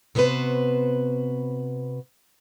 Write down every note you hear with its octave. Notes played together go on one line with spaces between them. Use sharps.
C3 B3 F#4 G4 B4 C5